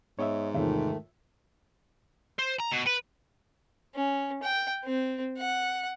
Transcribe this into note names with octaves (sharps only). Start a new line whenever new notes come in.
G#2 B3 C#5 D#5 E5
E2 C3 D#3 A3 F4 C#5 E5
C5
A#5
B2
B4
C#4
G5
C4
F#5